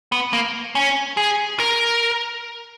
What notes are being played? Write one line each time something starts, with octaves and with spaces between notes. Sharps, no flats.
B3
A#3
C#4
G#4
A#4